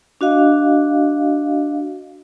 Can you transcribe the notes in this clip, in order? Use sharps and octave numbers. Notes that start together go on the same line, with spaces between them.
D4 F#4 D#5 F5